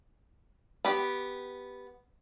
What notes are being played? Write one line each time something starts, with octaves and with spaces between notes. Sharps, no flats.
B3 G4